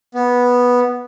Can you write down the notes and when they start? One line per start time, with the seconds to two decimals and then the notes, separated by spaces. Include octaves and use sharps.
0.14 B3